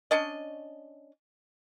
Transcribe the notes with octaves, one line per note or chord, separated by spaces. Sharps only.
C#4 D4 D#5